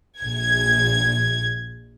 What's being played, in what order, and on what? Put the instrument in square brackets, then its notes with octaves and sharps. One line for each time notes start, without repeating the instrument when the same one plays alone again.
[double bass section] A#1 [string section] G#6